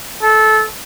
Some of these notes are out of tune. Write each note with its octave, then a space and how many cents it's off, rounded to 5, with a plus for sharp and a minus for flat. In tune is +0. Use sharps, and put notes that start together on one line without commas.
A4 -20